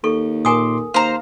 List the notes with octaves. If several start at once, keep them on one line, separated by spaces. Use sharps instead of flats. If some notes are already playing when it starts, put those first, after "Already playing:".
D#2 A4 C#6
A#2 A#4 G#5 C6 D6 D#6
D#2 C5 F5 A#5